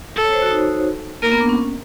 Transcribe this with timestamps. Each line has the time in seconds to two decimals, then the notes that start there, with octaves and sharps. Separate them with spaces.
0.16 A4
0.25 C#5
0.33 C5
0.42 F#4
0.51 D#4
1.22 A#3 A#4
1.32 B3
1.41 D4
1.49 C#4